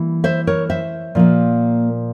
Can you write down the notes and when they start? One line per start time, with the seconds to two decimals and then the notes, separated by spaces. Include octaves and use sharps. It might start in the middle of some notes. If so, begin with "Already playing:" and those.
Already playing: E3 G3 A#3
0.24 C5 E5
0.47 A#4 C#5
0.70 C5 E5
1.15 A#2 F3 A#3